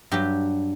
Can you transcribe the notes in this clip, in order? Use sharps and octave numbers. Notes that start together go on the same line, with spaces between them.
G2 F#3 G4